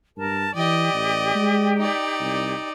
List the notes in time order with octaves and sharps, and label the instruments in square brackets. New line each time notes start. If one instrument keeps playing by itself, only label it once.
[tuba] G2 [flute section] A#4 A5
[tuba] E3 [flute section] G4 G5 [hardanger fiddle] D5 D#5
[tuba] A1
G#3
[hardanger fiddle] D#4 D5
[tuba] C2